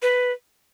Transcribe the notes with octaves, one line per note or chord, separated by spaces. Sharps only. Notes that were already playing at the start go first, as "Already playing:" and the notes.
B4